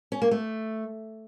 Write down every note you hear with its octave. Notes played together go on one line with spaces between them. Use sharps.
C#4
A#3
A3